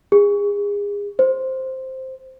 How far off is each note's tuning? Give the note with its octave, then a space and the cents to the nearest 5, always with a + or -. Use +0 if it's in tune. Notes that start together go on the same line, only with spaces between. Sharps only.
G#4 -30
C5 +0